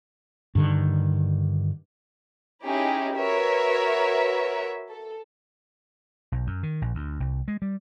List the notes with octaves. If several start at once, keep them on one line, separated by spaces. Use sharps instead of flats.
G2 D3 D#3
C#4 D#4 E4 G4 G#4
F#4 A#4 B4 C#5 E5
A4
B1
F#2
D#3
A#1
D2
C2
G#3
G3